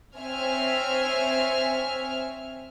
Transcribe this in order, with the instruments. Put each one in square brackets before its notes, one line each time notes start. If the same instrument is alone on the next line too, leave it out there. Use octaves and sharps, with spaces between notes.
[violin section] C4 C#5 E5 G#5 F6